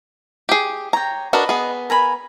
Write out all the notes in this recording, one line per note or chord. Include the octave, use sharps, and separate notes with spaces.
G4 G#4
C#5 G5 A#5
D4 F#4 A#4 B4 D#5
B3 G#4
A#4 G#5 B5